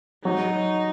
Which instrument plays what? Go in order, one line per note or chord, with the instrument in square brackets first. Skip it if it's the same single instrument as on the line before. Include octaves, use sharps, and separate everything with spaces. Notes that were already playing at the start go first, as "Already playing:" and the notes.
[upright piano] F#3 [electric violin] D#4